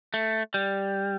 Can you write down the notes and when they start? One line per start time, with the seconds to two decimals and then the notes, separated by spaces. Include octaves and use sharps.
0.14 A3
0.54 G3